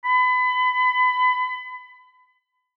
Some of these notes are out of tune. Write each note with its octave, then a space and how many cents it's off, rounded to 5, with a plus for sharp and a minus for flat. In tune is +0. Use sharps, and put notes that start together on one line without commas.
B5 +30